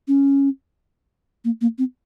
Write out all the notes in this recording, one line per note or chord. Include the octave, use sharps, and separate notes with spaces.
C#4
A#3
A#3
C4